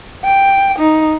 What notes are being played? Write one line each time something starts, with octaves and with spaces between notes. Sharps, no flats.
G5
D#4